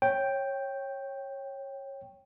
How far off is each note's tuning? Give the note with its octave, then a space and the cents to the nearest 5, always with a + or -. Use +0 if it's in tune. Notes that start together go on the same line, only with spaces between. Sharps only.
C#5 -20 G5 +0